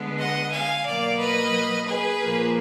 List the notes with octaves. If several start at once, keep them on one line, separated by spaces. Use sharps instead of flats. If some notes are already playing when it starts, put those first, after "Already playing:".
Already playing: D3 G#3 B3
D#5 F#5
F5 G#5
B2 F#3 A#3 D5 F5
B4 D#5
G#4 B4
A#2 F3 A#3